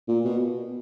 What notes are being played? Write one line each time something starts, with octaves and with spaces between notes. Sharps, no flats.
A#2
B2